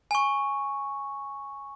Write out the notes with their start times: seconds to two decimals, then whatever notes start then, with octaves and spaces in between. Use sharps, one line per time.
0.11 G#5 C#6